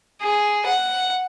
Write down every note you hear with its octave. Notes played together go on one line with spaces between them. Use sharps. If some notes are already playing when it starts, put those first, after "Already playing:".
G#4
F#5